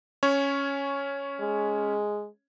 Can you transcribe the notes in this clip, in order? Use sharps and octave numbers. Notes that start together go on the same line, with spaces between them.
C#4 C#5
G#3